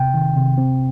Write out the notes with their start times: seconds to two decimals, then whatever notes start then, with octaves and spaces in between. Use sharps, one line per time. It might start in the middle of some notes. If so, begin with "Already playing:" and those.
Already playing: C3 G5
0.14 D#3
0.37 C3
0.58 C4